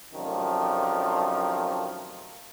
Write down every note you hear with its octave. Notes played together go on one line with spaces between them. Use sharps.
F#2 C3 D#3 F3 A3 D4